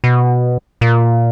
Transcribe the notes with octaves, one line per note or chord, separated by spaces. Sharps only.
B2
A#2